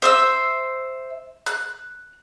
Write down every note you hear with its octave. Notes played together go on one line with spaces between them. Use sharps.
C5 E5 E6
F#6